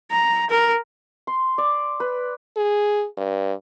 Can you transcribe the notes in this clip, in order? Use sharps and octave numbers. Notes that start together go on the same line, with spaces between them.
A#5
A#4
C6
D5
B4
G#4
G2